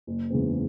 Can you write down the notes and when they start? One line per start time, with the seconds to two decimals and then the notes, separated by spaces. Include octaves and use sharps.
0.07 F#1
0.30 E2 C#3 G#3 C4